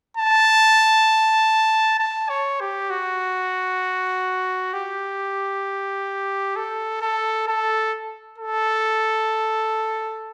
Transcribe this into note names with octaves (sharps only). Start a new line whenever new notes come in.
A5
A5
C#5
G4
F#4
G4
A4
A4
A4
A4